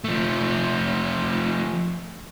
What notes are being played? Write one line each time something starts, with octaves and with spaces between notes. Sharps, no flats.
F3 A3